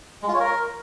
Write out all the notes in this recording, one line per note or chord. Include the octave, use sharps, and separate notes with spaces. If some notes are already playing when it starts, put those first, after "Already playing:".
G#3
F4
C#5
A#4